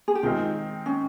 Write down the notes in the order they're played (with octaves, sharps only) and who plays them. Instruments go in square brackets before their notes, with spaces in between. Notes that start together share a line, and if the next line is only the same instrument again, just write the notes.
[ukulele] G#4
G4
[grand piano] D#3 G#3 C4 D#4 [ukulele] F4
[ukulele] C#4